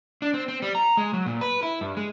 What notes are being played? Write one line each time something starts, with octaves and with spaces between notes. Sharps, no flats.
D4
C4
C4
G3
A#5
G#3
F#3
A#2
B4
E4
G2
G#3